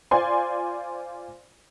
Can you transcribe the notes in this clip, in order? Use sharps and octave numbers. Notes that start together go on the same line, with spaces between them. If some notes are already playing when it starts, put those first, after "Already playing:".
F4 C5 D5 G#5 C6